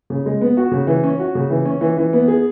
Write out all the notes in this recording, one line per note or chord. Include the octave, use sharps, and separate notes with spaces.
C#3
G#3
B3
F#4
C#3
E3
C#4
F#4
C#3
E3
C#4
E3
E3
B3
G#4